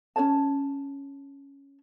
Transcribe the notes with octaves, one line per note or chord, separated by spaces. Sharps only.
C#4 C5 C#5 A5